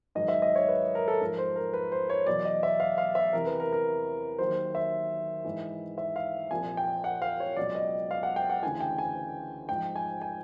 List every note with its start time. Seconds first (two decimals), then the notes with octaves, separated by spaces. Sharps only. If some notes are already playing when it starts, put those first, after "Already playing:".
0.15 G#2 D#3 F#3 D#5
0.28 E5
0.42 D#5
0.55 C#5
0.68 B4
0.95 A#4
1.08 A4
1.21 G#2 F3 A#4
1.38 C5
1.56 A#4
1.74 B4
1.92 C5
2.10 C#5
2.26 E2 B2 F#3 D5
2.45 D#5
2.63 E5
2.80 F5
2.98 F5
3.15 E5
3.33 E2 C3 E3 A#4
3.46 B4
3.60 A#4
3.73 A#4
4.38 D#2 D#3 F#3 C5
4.75 E5
5.45 G#2 E3
5.98 E5
6.16 F5
6.51 C2 A#2 F3 G#5
6.77 G5
7.04 F#5
7.22 F5
7.40 C#5
7.56 C#2 B2 F#3 D5
7.75 D#5
8.11 F5
8.23 F#5
8.36 G5
8.49 F#5
8.63 D2 C#3 E3 G#5
8.80 G5
8.98 G#5
9.69 G#2 F3 G5
9.96 G#5
10.22 G#5